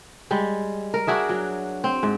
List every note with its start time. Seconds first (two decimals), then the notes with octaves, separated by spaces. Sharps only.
0.31 G3 G#3
0.94 A#4
1.07 D4 F#4 G#4 E5
1.29 F#3
1.84 C4
2.03 G#2